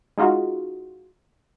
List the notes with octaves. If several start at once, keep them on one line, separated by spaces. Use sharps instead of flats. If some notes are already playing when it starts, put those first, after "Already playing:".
G#3 D#4 F4 F#4